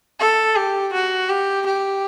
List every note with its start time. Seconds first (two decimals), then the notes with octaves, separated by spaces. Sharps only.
0.20 A4
0.56 G4
0.93 F#4
1.30 G4
1.66 G4